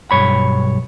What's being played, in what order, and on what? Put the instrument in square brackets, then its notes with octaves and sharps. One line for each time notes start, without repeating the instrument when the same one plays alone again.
[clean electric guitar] B1 G2 C#5 B5